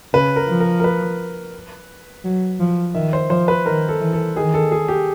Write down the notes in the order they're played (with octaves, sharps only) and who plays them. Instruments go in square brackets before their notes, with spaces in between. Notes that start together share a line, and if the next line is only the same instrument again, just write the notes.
[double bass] C#3 [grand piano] B4
[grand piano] A#4
[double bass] F3
[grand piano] A#4
A#4
B4
[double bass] F#3
F3
[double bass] D#3 [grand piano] E5
[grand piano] C5
[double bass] F3 [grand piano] C5
[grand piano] B4
[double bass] D#3 [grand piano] A#4
[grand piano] A4
[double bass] E3
[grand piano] A4
[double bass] D#3 [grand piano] G#4
[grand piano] A4
G#4
G4